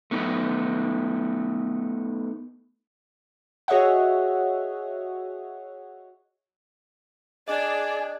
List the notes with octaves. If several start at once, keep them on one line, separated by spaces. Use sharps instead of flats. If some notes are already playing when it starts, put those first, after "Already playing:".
A3 B3 D#4
F#4 G#4 C#5 D#5 E5 F#5
D4 G#4 D5 D#5